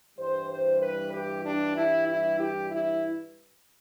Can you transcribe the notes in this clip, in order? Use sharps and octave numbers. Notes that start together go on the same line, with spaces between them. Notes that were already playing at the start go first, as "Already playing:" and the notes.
G2 E3 G3 C5
C5
B4
G4
D4
E4
E4
G4
E4